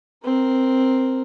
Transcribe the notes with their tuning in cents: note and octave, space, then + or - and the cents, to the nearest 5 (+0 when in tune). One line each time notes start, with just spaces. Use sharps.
C4 +0 A#4 +0